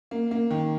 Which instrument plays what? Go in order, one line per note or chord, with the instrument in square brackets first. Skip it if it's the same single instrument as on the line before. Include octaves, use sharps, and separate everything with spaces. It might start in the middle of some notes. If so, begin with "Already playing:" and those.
[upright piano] A#3
A#3
D#3